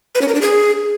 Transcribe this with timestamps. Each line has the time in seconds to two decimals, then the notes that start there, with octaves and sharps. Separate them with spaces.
0.15 B4
0.21 C#4
0.28 A#4
0.35 D4
0.41 G#4